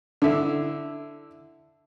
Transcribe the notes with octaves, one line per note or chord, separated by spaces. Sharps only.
D3 E4